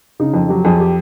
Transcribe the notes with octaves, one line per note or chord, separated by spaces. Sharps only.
C#3 D#4
F2
F#3 G4
F2 G#4
G4